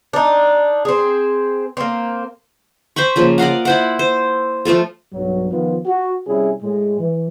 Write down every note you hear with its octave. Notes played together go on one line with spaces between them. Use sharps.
D4 D#4
C4 G#4
A#3 C4
C5 G5 B5 C#6
C#3 F3 A#3
D5 D#5 F5 F#5
E4 C5 F#5
C5
F3 A3 F4 A4
B1 G2 F#3
D#3 F3 B3 F4
F#4
C3 G3 C#4 E4 G#4
A2 G#3
E3